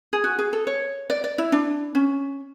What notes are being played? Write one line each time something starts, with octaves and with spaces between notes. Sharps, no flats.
G#4
F#4
G#4
A4
C#5
D5
D5
E4
D4
C#4